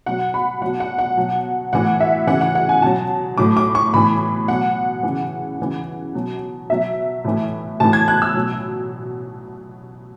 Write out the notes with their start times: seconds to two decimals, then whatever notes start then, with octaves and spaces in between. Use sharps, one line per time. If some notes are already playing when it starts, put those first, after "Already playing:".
0.06 B2 F#3 F#5
0.34 B5
0.62 B2 F#3 F#5
0.80 F#5
0.98 F#5
1.17 B2 F#3
1.73 A2 E3 F#5
2.00 E5
2.27 C#3 E3 F#5
2.41 F#5
2.55 F#5
2.69 G#5
2.82 B2 F#3 A5
3.38 A2 F#3 D6
3.57 D6
3.75 C#6
3.94 A2 E3 B5
4.48 B2 F#3 F#5
5.03 C#3 E3
5.59 C#3 E3
6.15 B2 F#3
6.70 B2 F#3 E5
7.25 A2 E3
7.80 A2 E3 A5
7.93 G#6
8.08 F#6
8.22 E6
8.35 B2 F#3